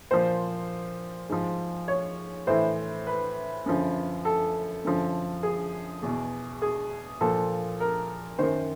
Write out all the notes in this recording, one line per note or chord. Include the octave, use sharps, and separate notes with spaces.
A#2 F3 C5
G#2 F3
C#5
A2 E3 C5
B4
F#2 D3 F3
A4
F#2 D3 F3
G#4
E2 B2
G#4
A#2 F3 A4
A#4
F#2 D#3 C5